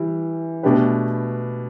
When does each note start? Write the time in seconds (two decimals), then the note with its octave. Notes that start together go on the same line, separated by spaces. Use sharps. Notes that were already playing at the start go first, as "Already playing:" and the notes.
Already playing: E3 G3
0.63 B2 A3 D4 G4 B4